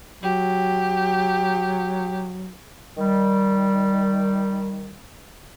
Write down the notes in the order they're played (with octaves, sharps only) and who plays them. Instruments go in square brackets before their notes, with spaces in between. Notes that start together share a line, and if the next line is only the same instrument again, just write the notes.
[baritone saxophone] F#3 [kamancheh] G4
[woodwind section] D#3 G3